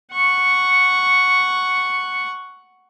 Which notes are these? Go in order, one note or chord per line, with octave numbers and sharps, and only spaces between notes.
F#5 C#6